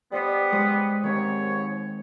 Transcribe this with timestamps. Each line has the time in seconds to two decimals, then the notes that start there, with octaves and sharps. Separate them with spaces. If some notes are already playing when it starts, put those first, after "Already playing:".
0.12 G3 B3 B4 C5 D#5
0.52 G#3 C5 D#6
1.03 D#2 G#2 D#3 C4 C#5